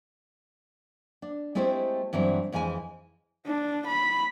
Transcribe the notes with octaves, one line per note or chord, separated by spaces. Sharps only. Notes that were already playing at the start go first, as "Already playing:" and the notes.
D4
G#3 A3 C4 E4 G4 C5
G2 E3 F#3 C4
F2 E3 G#3 G5 G#5
D4
B5